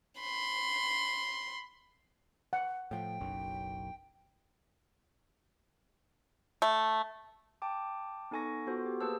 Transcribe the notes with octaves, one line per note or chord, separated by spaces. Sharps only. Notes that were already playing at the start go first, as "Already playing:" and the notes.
B5 C6
F#5
A2 F3 G5
F#1 B1 F#2
A3
G5 A5 D6
B3 D#4 A4 G#5 C#6 A#6
B3 F4 F#4 A4 C5
G4
A#3 G#4 B4 C5 A5 E6